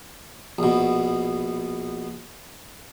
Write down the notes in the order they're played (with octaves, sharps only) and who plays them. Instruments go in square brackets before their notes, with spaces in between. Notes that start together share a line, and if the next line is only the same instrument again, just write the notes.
[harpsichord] A#1 B2